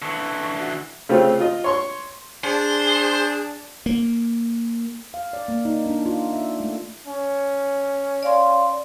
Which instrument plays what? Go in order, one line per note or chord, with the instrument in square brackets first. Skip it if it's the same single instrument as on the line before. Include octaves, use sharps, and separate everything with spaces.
[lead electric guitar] D3 E3 [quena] C#6
[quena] F#4
[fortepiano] C#3 A3 C4 F4 G4
F4 D#5
C#5 C6 C#6
[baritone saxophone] D4 [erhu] G#4 [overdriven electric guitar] C5
[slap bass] A#3
[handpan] F5
D5
A#3
D#4
D4
F4
E5
A3
[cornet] C#4
[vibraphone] D5 F5 C6